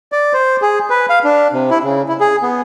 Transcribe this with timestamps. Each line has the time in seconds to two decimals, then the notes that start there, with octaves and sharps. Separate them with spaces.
0.12 D5
0.33 C5
0.62 G#4
0.90 B4
1.10 F5
1.24 D4
1.53 C3
1.71 E4
1.84 C#3
2.09 E4
2.20 G#4
2.42 B3